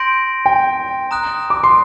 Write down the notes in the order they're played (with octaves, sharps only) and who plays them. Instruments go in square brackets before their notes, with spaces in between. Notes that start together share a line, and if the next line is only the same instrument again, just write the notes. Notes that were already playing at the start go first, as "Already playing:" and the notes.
Already playing: [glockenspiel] C6 G6 A#6 D7
[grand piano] G5
[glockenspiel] A#5 D#6 F#6
[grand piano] D6
C6